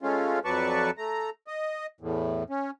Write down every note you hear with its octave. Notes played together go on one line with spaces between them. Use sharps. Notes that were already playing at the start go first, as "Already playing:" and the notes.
G#3 A3 C#4 F4
F2 F#3 B4 D5 A5 C#6
A3 A#5
D#5
E2 A2
C#4